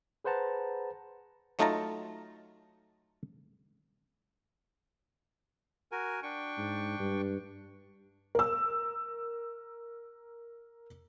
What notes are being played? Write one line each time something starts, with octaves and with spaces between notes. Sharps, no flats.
G#4 B4 C5 F#5 A5 A#5
F#3 A3 D#4 F4 A5 A#5
F#4 A#4 G#5
D4 G5 C#6
G#2
G2
A#4 E6